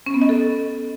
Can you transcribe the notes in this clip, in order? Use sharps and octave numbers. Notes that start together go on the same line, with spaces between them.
C#4
B3
D#5
A4